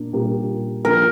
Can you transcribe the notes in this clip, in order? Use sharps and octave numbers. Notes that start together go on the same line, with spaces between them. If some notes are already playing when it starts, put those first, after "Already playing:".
Already playing: A#2 D4 A#4
A#2 G3 D4 G4 A#4
F3 A#3 D4 F4 A#4